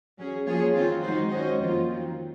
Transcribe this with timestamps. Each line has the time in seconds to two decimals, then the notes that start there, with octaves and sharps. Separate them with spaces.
0.18 F#3 C#4 G#4
0.46 F3 A#3 F4 G#4 C#5
0.74 D#3 F#3 C4 F4
1.02 D#3 G#3 D#4 F#4 C5
1.30 G#3 C#4 F#4 C5 D#5
1.58 F2 D#3 A#3 F4
1.86 D#3 F#3 C4